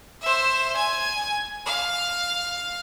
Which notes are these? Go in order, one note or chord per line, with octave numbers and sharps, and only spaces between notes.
C5 E5
G#5 G#6
F5